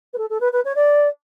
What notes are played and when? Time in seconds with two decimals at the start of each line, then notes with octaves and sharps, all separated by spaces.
0.13 B4
0.18 A4
0.30 A4
0.40 B4
0.52 B4
0.65 C#5
0.75 D5